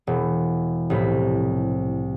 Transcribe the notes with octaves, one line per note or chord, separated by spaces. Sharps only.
E1
C2 A2 F3 B6